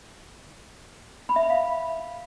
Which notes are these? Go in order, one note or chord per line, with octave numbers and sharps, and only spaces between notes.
B5
E5
B5
F5